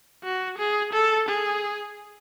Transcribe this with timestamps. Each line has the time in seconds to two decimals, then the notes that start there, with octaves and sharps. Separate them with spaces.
0.24 F#4
0.58 G#4
0.93 A4
1.28 G#4